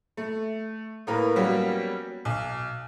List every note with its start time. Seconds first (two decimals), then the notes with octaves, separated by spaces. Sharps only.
0.17 A3
1.07 A2 A#3 A#4 B4
1.36 F#3 G3 A#3 B3 C#4 G4
2.25 B1